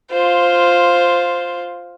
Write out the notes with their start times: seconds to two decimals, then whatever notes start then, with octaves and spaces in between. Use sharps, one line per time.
0.11 F4 C5